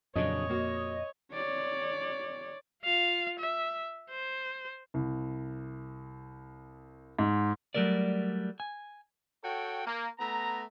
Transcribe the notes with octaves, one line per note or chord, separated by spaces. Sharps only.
F2 A#2 C#3 F#3 D4 C#5 D#5
A#3 F#4
C#5 D5
F4 F5
E5
C5
C2
G#2
F#3 G3 A3 A#4 D5
G#5
F#4 A4 C#5 G5
A#3
A3 B3 A#5